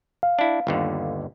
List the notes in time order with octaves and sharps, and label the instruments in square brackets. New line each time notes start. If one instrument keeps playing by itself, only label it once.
[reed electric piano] F5
[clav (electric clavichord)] D4 E4
G1 D#2 D3